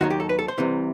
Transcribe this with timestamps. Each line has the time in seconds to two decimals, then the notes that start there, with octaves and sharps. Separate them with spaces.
0.01 D#2 D#3 F#3 F#4
0.10 G4
0.20 A4
0.29 B4
0.39 A4
0.48 C5
0.58 C2 C3 E3